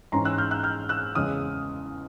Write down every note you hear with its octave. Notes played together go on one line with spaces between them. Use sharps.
G#2 E3 G#3 C#4 A#5 C6
E6 F#6
F6 G6
E6 F#6
F6 G6
E6 F#6
E2 C#3 E3 G#3 D#6 F6